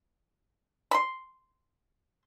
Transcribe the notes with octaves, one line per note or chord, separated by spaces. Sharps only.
B5 C6